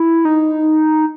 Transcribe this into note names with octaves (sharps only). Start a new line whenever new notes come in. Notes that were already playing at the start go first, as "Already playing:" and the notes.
Already playing: E4
D#4